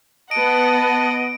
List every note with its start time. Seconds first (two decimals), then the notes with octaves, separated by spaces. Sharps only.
0.31 B3 D#5 F#5 A5 D7